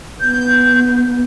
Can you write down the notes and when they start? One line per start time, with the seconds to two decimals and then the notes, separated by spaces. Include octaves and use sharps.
0.21 B3 G6